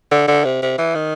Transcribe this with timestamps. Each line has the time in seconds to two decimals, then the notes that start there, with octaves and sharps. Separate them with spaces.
0.11 D3
0.28 D3
0.44 C3
0.62 C3
0.78 E3
0.95 D#3